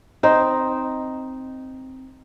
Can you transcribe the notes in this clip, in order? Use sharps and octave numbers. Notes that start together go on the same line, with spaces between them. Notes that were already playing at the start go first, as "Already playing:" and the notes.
C4 D#4